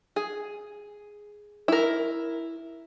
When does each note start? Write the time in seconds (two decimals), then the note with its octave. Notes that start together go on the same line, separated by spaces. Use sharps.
0.16 G#4
1.68 E4 A#4